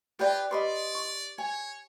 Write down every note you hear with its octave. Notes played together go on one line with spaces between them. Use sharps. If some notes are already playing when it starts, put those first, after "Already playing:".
F4 G4 G#4 B4 D5 E5 G5
G4 B4 D5 D#5 B5 C6 D6
C#6
C#5 G#5